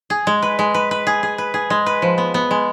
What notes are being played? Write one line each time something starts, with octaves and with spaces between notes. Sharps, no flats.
G#4
G#3
B4
G#3
B4
B4
G#4
G#4
B4
G#4
G#3
B4
F3
B3
B3
G#3